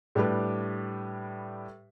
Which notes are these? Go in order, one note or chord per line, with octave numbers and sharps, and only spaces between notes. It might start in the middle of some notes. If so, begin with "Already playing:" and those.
A2 G3 D4 G4 B4